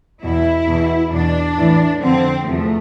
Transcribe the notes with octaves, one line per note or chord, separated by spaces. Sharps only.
E2 B2 E4
E2 B2
E2 B2 D4
A2 E3
F2 D3 F3 C4
E2 C3 F3 A3